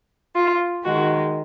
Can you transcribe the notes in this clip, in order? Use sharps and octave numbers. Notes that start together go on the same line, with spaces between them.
F4
D#3 G#3 F#4